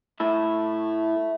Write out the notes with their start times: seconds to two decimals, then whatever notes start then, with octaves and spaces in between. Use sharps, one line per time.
0.20 A2 A3 E4